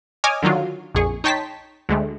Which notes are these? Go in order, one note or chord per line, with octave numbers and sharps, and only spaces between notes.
C#5 D#5 G#5 D6 D#6 F6
D3 D#3 F#3 F4 F#4
A#1 F2 G#4 C#6
D#4 C#5 G5 A5 C6 B6
D2 G#3 A3